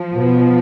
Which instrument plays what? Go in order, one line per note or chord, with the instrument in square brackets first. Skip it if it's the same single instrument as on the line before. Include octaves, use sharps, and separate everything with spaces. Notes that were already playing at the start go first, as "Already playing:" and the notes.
Already playing: [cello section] F3
[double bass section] B2 B3